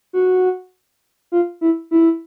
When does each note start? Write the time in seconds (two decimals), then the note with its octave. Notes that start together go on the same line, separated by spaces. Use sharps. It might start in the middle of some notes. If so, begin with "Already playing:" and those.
0.13 F#4
1.32 F4
1.61 E4
1.91 E4